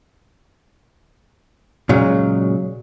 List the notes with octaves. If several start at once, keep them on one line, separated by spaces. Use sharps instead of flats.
A#2 C#3 F#3 G#3